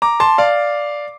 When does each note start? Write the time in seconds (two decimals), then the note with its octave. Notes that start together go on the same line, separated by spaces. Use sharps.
0.02 A#5 D6
0.20 A5 C6
0.38 D5 F5